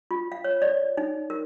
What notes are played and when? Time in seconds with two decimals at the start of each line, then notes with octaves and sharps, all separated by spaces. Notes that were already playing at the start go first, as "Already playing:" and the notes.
0.11 F4
0.32 F5
0.44 C#5
0.62 D5
0.97 D#4
1.30 A#4